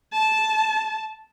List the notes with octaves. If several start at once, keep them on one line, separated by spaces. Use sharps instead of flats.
A5